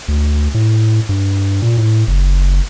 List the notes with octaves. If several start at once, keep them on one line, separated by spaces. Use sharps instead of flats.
D2
A2
G2
A#2
A2
F#1